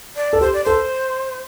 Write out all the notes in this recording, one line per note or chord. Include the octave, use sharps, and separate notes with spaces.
D5
A4
G4 C5
D5
A4 C5